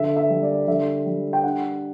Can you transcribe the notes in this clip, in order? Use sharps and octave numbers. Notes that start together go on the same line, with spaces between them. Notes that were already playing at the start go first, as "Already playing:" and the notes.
Already playing: D3 E5
E5
G3
D5
D3 E5
G3
G5
D4 F#5